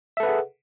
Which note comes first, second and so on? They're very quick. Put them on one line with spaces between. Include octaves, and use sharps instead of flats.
E5 A4 B4 F#5 G#4